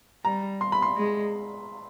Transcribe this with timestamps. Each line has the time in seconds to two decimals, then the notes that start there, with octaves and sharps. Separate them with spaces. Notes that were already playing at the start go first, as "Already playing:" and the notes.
0.24 G3 A#5
0.61 C6
0.72 B5
0.82 C6
0.97 G#3